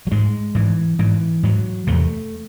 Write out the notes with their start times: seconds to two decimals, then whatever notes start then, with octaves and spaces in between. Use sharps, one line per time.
0.07 F#3
0.11 G#2 G#3
0.55 G#2 E3
0.99 G#2 E3
1.43 G#2 F#3
1.87 E2 C3 A3